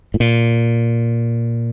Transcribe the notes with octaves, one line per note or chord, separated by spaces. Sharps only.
A2
A#2